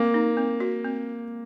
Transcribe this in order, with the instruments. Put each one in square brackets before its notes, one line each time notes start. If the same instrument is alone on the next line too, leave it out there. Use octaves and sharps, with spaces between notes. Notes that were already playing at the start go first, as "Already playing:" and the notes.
Already playing: [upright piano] A#3 [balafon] C4
[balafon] D#4
C4
F#4
C4